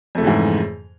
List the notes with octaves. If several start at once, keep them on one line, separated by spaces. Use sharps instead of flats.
F2 G#2 C#3 E3 A3